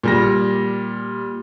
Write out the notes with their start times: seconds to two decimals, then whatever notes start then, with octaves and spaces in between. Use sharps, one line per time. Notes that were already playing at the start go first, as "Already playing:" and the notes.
0.04 A#2 G3 A#6